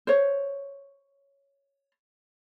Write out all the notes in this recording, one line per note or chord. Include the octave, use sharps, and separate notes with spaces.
C5 C#5